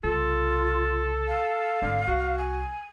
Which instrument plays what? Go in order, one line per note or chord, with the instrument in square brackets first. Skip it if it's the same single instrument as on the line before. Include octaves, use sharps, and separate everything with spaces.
[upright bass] C2 C#3 [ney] F4 [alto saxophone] A4
[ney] F5
[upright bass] G#1 [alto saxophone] D3
[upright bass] C2 [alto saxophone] F#4
[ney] G#5